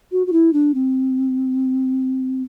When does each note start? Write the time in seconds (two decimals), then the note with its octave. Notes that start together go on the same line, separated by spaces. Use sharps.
0.12 F#4
0.27 F#4
0.32 E4
0.53 D4
0.74 C4